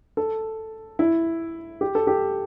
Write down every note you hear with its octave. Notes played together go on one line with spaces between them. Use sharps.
A4
E4
G4
A4
G4